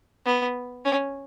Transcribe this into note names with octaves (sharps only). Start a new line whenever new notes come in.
B3
C#4